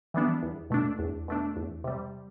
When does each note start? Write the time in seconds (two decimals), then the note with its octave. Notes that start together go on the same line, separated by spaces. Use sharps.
0.14 E3 G3 B3 D4
0.43 E2
0.70 B2 A3 D4
0.99 E2
1.28 B2 A3 D4
1.56 E2
1.84 C3 G3